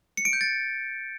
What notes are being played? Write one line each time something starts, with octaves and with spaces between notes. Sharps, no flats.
C#7
D7
G6
A6